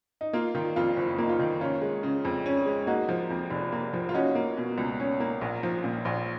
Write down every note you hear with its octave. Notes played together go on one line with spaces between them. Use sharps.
D#4
A#3 F4
D#3 F4
F2 F4
F#1
A#3 D#4
F4
D#3
C#4 F4
G#3
C#3
F2
C#4
G#3
A#3 D#4 F#4
F3
F2
F1
A#3
F3
F4
C#4 D#4 F#4
A#3
B2
C#2
C#4
A#3
A#1
F3
A#2
A#1